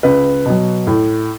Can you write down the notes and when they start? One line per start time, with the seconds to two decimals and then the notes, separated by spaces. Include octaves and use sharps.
0.03 C#2 B4
0.46 B2 F#3
0.87 A2